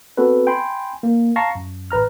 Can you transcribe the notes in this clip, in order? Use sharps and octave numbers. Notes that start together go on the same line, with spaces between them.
B3 C4 F#4 A4 B4
G5 G#5 B5 C6
A#3
F5 A5 A#5 C#6 A#6 C7
F#2
A1 B4 A#5 F6